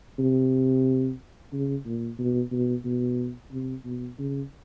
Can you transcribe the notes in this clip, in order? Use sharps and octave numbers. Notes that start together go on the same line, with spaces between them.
C3
C#3
A#2
B2
B2
B2
C3
B2
C#3